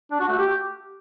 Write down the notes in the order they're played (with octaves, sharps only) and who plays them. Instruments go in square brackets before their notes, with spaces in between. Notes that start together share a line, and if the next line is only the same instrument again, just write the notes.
[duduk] D4
F#4
A3
G4